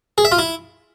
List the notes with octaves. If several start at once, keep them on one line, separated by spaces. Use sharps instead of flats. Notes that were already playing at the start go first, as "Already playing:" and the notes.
G#4
E5
F4
E4